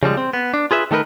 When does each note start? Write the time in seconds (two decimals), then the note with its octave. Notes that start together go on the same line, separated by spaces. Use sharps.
0.03 C#3 F3 G3 G#3
0.17 C4
0.33 B3
0.54 D4
0.71 F4 G#4 B4 E5
0.91 D#3 A3 D#4 A#4 B4